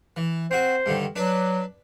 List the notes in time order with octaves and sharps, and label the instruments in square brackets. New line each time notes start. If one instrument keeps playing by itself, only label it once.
[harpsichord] E3
[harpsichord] C4 F#4 [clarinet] C5
[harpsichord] G2 D3 D#3
[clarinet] F#3 [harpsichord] D4 B4